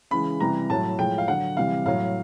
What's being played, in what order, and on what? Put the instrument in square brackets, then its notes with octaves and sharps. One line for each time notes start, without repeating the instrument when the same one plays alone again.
[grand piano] C#3 E3 G#3 B5
C3 E3 G3 A#5
A2 F#3 A5
A2 F3 G#3 G5
F5
D3 F#3 F#5
C3 E3 G3 F5
A2 F#3 F5